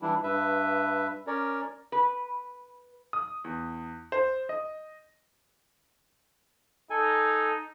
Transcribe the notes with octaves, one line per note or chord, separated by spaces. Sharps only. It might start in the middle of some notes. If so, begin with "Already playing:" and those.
E3 G3 D4 E4
G2 B4 E5
C#4 A#4 C#5 D5
B4
D#6
E2
C5
D#5
D#4 A4 G#5